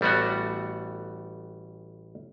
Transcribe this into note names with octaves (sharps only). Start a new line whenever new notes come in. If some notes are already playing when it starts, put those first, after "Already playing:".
A1 G3 A3 B3 F#4